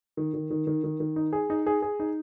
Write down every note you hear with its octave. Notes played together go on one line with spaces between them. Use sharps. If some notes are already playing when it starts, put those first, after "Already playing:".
D#3
D#3
D#3
D#3
D#3
D#3
D#4
G#4
D#4
G#4
G#4
D#4